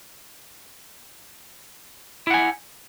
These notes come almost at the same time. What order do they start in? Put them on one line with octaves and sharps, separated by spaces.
E4 F#5 G#5